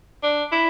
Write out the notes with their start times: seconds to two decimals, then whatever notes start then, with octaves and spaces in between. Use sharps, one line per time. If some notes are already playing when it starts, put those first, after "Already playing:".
0.23 D4
0.52 E4